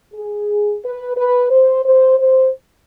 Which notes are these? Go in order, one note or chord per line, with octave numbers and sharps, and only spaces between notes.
G#4
B4
B4
C5
C5
C5